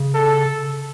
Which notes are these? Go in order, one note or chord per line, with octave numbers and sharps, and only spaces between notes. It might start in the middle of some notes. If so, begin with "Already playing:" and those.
Already playing: C#3
A4